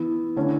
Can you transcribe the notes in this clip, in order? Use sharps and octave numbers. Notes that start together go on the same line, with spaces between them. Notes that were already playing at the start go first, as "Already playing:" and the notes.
Already playing: E3 B3 E4
D3 A3 C#4 E4